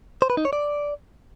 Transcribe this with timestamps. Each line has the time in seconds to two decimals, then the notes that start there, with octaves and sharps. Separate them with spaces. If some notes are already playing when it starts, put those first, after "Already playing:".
0.22 C5
0.30 B4
0.37 D#4
0.45 C#5
0.53 D5